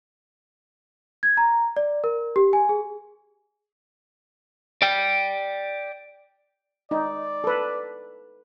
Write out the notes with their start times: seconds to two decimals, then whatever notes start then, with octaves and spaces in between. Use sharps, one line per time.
1.23 G#6
1.37 A#5
1.76 D5
2.04 A#4
2.36 G4
2.53 G#5
2.69 G#4
4.82 D5 G5
6.91 D#4 D5
7.44 A4 B4